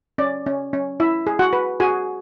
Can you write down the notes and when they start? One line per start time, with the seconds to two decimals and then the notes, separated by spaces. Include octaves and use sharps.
0.18 C#4 D5
0.46 C#4
0.73 C#4
1.00 E4 E5
1.27 G#4
1.39 F#4 F#5
1.53 B4
1.80 F#4 G#4 G#5